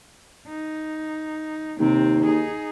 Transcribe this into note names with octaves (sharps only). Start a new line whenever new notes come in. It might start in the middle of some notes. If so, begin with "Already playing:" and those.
D#4
D#2 C3 C4
D#4 G#4